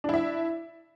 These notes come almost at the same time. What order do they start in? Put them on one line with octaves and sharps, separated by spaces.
D4 E4 E5